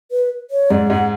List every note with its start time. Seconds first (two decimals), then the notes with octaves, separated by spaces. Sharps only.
0.11 B4
0.51 C#5
0.70 G#2 G#3 D5
0.90 G#2 G#3 F#5